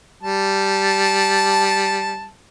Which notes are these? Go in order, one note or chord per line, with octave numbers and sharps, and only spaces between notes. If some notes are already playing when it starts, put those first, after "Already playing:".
G3 A5